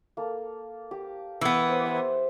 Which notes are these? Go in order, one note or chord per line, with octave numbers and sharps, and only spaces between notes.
A#3 A4
G4
E3 B3
C5
E5